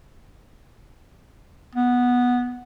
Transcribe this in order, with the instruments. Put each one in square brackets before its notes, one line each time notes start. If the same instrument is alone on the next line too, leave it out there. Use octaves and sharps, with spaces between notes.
[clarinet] B3